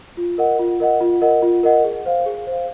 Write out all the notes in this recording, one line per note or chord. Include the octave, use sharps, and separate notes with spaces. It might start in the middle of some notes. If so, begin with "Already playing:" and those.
F4
A#4 D#5 F#5
F4
A#4 D#5 F#5
F4
A#4 D#5 F#5
F4
A#4 D#5 F#5
G#4
C5 F5
G#4
C5 F5